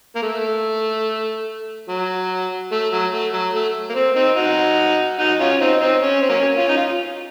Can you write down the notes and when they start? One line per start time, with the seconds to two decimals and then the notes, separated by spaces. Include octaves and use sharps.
0.16 A#3
0.23 A3
1.88 F#3
2.72 A3
2.92 F#3
3.12 A3
3.33 F#3
3.53 A3
3.89 A#3
3.95 C4
4.15 C4 D#4
4.36 D#4 F#4
5.19 D#4 F#4
5.40 C#4 F4
5.60 C4 D#4
5.80 C4 D#4
6.02 C#4
6.21 C4
6.29 F#3 A#3 C#4
6.57 C#4 F4
6.69 D#4
6.77 F4